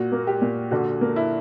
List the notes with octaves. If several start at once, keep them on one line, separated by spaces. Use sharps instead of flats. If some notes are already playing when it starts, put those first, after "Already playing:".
Already playing: A#2 F#4
A#3
G4
A#2
D3 F#4
A#3
E4